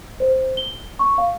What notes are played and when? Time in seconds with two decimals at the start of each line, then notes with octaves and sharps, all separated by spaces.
0.20 C5
0.57 G7
0.99 C#6
1.18 F5